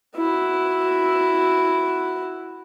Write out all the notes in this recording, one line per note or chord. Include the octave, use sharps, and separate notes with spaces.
E4 F#4